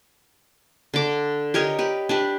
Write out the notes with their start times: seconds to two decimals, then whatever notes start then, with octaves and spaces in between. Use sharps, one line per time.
0.94 D3 D6
1.54 G4 A#4 C#5 D#5
1.79 G4 B4
2.09 D4 G4 B4